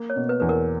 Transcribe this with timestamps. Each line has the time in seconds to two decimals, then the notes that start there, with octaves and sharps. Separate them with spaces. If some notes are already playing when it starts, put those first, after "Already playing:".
Already playing: A#3
0.10 C#5
0.16 B2
0.29 B4
0.40 E2 B4
0.49 A#4